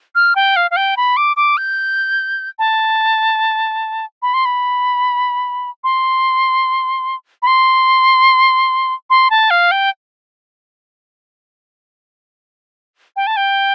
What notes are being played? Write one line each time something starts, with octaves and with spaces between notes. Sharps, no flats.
F6
G5
F5
F5
G5
B5
D6
D6
G6
A5
B5
C6
B5
C6
B5
C6
C6
A5
F5
G5
G5
A5
G5